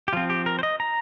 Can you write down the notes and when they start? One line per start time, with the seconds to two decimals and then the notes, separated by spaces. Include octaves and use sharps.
0.08 G4
0.13 F3 C4 F4
0.30 G4
0.46 A#4
0.59 C5
0.63 D#5
0.80 A#5